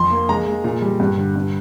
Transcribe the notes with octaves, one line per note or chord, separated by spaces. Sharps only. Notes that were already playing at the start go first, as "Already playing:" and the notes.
Already playing: F2 C6
A#3
G#3 A#5
G#3
A#2
G3
G2
D3
G2